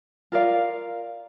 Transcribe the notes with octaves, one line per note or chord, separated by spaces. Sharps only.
F4 A#4 D5 F5